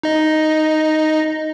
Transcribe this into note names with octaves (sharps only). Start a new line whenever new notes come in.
D#4 D#5